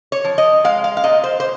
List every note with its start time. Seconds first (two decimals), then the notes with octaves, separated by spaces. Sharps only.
0.12 C#5
0.25 F3
0.38 D#5
0.64 G#3 F5
0.84 F5
0.97 F5
1.04 A#2 D#5
1.24 C5
1.40 C5